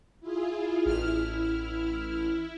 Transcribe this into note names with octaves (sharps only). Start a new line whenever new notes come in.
E4 F4 G#4
A1 E4 F6